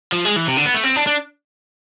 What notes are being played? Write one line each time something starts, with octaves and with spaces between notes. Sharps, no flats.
F3
G#3
E3
C3
D3
B3
A3
C4
D4
D4